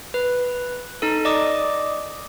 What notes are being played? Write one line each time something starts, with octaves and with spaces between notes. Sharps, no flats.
B4
D#4 A4
D5 D#5 D6 D#6